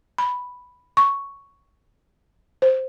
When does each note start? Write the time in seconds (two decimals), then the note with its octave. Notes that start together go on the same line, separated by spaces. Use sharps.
0.18 B5
0.97 C#6
2.62 C5